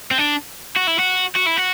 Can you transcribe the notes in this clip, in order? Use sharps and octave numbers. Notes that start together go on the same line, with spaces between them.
C4
D4
F#4
E4
F#4
F#4
E4
F#4